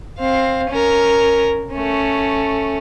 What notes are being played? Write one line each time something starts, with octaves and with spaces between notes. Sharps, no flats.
C4 F5
C#4 A#4
A3 C#4